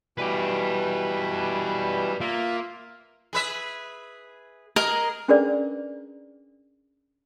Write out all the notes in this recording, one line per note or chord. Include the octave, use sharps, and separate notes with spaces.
B2 E3 G3 B4 D5
A#3 F4 E5
G#4 B4 E5
G#4 A#4 D#5
C#4 D4 G#4 A#4 B4 D5